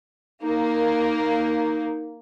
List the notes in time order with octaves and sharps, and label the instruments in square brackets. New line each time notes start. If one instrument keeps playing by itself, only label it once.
[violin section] A#3 [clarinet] D#4